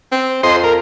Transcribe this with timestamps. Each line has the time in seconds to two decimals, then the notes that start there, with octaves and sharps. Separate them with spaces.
0.12 C4
0.43 F2 C5 D#5 C6
0.64 A#4